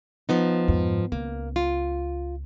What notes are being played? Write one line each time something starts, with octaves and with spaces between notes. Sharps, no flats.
F3 B3 D#4
F2 G#2
C#2 A#3
F4